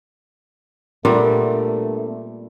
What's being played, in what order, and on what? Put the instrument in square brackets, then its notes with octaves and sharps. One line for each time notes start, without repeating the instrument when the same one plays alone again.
[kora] A#2 G3 [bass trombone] A3 [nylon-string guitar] B3 D4 A#4